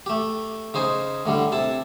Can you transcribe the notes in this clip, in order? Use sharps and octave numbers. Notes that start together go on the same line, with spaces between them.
A3 G4
C#3 D#4 C5 G#5
A2 D3 G3
C3 E4 A5